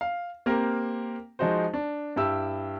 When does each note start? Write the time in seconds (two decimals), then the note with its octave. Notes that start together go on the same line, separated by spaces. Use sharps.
0.01 F5
0.46 A#3 C4 G4 A#4
1.39 F3 G#3 D#4 F#4 C5
1.74 D4
2.16 G2 E4 G4 E6